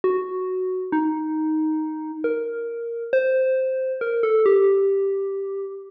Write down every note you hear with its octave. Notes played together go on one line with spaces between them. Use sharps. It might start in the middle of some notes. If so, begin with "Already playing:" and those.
F#4
D#4
A#4
C5
A#4
A4
G4